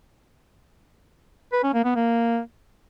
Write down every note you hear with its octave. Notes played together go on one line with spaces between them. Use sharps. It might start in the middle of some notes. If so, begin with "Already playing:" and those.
B4
C#4
A#3
B3
A#3